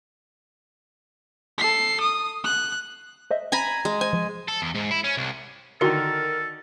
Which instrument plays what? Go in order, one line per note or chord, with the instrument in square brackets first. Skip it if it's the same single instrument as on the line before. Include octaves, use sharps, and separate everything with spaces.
[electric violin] A4 C7
D#6
F#6
[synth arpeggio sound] C5 D#5 E5
[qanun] G#5 A#5 B5
G#3
[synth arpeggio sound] C5 [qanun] G#5
[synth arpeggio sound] F3
[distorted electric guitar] A4
E2
G#2
E4
C#4
C2
[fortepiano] D3 D#3 [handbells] F#4 C6 C#7 [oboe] A4 [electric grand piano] A#4